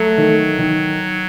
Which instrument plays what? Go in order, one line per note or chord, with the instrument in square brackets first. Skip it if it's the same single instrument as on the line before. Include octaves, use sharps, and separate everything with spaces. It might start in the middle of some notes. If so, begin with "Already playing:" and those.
Already playing: [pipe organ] F#3 [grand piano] A3
[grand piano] D#3
D#3